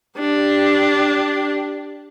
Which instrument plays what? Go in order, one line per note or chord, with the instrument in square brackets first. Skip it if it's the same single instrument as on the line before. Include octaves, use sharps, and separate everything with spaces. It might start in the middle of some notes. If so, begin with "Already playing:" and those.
[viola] D4 G4